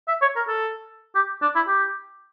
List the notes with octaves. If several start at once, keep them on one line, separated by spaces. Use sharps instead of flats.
E5
C#5
A#4
A4
G4
D4
E4
G4